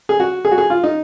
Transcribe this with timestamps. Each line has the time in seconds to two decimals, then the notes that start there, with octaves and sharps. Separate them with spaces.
0.09 G#4
0.20 F#4
0.45 G#4
0.52 F#4
0.58 G#4
0.70 F4
0.84 D#4